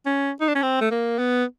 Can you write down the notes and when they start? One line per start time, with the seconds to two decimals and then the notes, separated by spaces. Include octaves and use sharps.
0.06 C#4
0.41 D#4
0.48 D4
0.55 C#4
0.63 C4
0.81 A3
0.91 A#3
1.19 B3